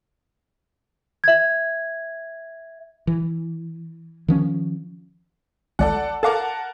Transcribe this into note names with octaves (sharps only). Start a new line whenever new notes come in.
E5 G#6
E3
D#3 F3 C#4
G#1 C#2 A4 D5 F#5
A4 A#4 F5 F#5 A5 D6